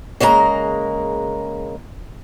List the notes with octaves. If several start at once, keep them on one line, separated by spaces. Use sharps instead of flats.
C#3 G#3 A#3 D#5 A#5